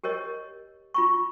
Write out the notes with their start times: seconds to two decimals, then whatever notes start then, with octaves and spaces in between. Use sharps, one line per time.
0.04 G4 A#4 C#5 D#5
0.94 F4 B5 C#6